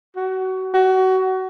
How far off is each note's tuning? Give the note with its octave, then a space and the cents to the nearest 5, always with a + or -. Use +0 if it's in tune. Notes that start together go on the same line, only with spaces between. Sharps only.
F#4 +25
F#4 +25